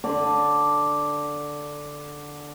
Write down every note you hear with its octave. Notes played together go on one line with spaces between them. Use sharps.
D3 D5 C6